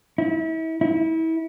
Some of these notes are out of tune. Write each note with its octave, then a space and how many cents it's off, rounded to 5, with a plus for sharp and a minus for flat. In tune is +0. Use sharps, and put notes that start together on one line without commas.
E4 -35
E4 -30